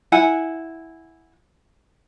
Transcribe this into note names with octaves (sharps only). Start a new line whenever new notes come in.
E4 F#5 G#5